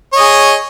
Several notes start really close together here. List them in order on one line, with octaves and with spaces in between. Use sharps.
C#5 D#5 G#4